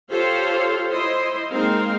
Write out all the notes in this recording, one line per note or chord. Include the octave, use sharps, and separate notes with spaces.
F4 G4 A4 C5 C#5 F5
E4 C5 D#5 C6
G#3 A#3 C4 D#4 A#4 F5